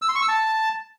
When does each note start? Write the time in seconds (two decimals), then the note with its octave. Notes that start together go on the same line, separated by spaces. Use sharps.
0.02 E6
0.08 C6
0.15 C#6
0.22 E6
0.28 A5